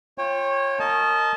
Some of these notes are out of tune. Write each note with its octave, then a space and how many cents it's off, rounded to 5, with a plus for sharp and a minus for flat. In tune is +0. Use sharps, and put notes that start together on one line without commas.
F4 +0 C#5 -20 G5 +25
A#4 -30 D#5 +0 A5 -30